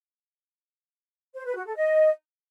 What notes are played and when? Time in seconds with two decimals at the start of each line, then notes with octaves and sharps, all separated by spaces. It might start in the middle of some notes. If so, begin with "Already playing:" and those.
1.35 C5
1.46 B4
1.56 F#4
1.66 A4
1.76 D#5